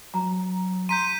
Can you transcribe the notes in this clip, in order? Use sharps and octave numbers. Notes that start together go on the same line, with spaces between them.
F#3 A#5
A#5 C6 G6 B6 D#7